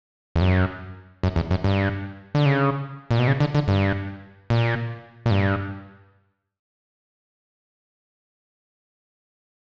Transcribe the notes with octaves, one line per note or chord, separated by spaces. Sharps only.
E2
F#2
F#2
E2
F#2
G2
D3
C#3
A#2
B2
C#3
D3
D3
G2
A#2
A#2
G2